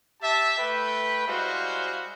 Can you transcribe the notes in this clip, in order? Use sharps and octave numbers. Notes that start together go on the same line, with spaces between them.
G4 E5 A5
A3 B4 G5 B5
G3 G#3 E4 F#4 C5 F5